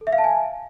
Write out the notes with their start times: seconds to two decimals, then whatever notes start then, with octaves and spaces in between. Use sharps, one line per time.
0.01 A4
0.07 E5
0.13 F5
0.18 A5
0.24 G#5